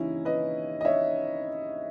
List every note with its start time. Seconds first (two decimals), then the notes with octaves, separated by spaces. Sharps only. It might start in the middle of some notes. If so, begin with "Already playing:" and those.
Already playing: D#2 C#3 E3 C#4 D#4 E4
0.25 B4 D#5
0.81 D#5
0.85 C#5 E5